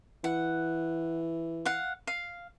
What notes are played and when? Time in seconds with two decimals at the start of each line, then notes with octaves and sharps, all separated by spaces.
0.24 E3 F#5
1.65 F5 F#5
2.07 F5